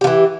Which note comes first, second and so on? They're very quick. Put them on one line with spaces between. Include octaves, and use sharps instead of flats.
G4 F3 E3